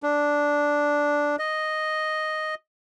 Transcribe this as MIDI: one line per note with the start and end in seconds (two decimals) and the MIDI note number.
0.03 1.36 62
1.39 2.55 75